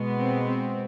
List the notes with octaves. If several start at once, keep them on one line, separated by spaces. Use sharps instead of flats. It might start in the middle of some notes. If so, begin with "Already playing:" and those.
Already playing: B2 G#3 B3
C4
C4